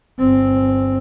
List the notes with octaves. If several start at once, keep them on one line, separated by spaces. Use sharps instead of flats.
G1 C4